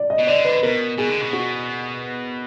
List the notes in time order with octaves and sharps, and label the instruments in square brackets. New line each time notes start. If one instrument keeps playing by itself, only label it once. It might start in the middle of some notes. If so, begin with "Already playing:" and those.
Already playing: [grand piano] D5
D#5
[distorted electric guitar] B2
[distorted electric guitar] D3 [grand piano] D5
[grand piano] B4
[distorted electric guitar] B2 [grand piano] A#4
[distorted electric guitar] B2 [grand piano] G#4
[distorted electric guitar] D3
B2
[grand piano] F#4